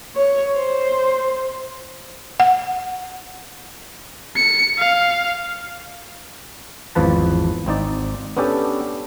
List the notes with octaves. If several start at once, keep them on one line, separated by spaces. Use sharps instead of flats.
C#5
C5
F#5
C#7
F5
G#1 E2 F3 B4 A5
G#1 C4 D#4 D5
B3 C#4 D4 G4 A4